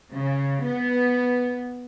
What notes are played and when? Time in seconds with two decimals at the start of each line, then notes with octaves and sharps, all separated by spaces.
0.12 C#3
0.65 B3